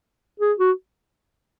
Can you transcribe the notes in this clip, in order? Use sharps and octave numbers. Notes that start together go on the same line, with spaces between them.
G#4
F#4